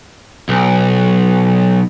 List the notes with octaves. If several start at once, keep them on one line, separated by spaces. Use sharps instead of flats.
B1